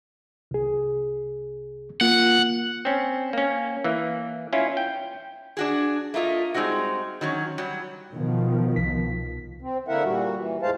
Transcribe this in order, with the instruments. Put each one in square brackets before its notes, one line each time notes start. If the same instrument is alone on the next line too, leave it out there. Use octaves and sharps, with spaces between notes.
[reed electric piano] C2 G#4
[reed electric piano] A#3 F4 [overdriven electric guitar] F#5
[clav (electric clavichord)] C4 C#4
A#3 C#4
E3 A#3
C#4 E4 F4
G5
[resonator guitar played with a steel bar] D4 F#4 G#4
A3 A#3 F4 D#5
G3 G#3 C4 D#4 F#4
D#3 F#3 C#4
F#3 G3
[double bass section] B2 D#3 F3
[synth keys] C2 B6
[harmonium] C4
D3 A#3 E4 A#4 E5 F#5
A#2 G3 F#4
E3
E2 A2 G#3 C5 F5 A5